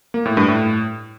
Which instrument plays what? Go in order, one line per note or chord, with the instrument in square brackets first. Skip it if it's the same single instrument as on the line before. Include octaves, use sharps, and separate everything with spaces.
[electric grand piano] A#3
A2
G2
A2